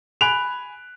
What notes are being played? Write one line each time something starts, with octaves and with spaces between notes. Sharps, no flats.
G#5 B5 F#6 D7 F7